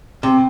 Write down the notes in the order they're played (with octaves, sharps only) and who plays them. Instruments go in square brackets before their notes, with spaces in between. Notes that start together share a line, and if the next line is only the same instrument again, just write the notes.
[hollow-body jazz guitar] C3 [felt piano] C4